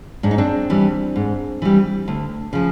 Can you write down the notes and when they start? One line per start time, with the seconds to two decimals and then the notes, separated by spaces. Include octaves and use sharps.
0.23 G#2 D4
0.31 D#4
0.38 C4 D4
0.70 E3 G3
1.16 G#2
1.62 E3 G3
2.08 D2
2.53 C#3 F3